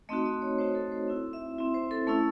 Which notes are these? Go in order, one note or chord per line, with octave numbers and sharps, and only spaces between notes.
A3 C4 D#4 F#4 D#5
D#5
C#5
A3 C4 D#4 F#4 C5
A4
C5
C4 E4
E5
C4 E4
C5
A4
A3 C#4 E4 A4